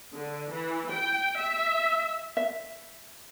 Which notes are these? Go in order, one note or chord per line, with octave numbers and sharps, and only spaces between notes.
D3
E3
G5
E5
E5